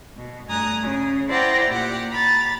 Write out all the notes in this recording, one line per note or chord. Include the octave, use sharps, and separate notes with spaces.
B2
G2 A3 G#5 A#5 D#6 F#6
C#3
E4 C5 D5 F#5 G5 A#5
A#2 G4 F#5
A#5 B5 A6